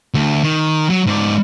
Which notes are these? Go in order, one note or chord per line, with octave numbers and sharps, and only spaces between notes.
D2
D#3
F#3
G#2 D5